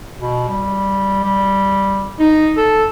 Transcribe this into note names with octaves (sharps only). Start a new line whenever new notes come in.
B2
G3
G3
D#4
A4